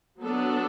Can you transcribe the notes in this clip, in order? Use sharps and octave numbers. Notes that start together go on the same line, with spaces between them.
F#3 B3 D4 A4